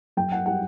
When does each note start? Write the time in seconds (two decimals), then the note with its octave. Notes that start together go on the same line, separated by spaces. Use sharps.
0.17 F#2 G5
0.32 F#5
0.46 G3 F#5